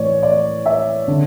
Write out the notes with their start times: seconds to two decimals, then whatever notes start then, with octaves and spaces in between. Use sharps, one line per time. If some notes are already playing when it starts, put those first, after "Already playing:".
Already playing: A2 E3 C#5 D5
0.23 D5
0.66 E5
1.08 D3